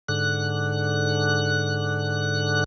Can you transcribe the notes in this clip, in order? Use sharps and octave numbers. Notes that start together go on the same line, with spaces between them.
G#2 D3 F#6